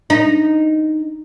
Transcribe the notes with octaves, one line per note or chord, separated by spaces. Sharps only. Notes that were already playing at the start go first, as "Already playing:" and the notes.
D#4